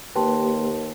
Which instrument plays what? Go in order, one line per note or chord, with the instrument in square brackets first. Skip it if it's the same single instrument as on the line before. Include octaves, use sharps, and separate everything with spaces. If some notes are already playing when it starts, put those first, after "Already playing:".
[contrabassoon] D#2 [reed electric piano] A#3 G4 B4 [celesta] G5 A5 C6